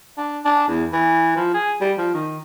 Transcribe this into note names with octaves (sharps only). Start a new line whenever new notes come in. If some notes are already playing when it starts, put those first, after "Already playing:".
D4
D4
E2
E3
F3
G#4
G3
F3
D#3